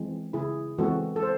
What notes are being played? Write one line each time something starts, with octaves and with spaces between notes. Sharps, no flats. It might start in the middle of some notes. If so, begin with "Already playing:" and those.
Already playing: E3 G#3 C4
C#3 E4 G#4
E3 G#3 C4 F#4 A4
A4
C5